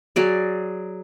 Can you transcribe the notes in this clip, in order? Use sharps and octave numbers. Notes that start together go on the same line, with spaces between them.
F#3 G#4 D5